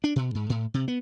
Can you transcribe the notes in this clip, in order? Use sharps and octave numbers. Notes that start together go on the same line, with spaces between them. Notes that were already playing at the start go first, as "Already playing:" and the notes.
D4
B2
G#2
A2
C3
B3